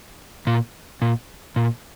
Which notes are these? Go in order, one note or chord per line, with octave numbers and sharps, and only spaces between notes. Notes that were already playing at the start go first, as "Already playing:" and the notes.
A#2
A#2
A#2